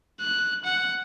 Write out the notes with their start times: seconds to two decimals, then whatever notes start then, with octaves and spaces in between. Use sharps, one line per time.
0.21 F#6
0.65 F#5